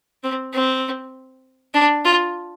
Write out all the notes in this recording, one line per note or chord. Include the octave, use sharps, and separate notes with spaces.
C4
C4
D4
F4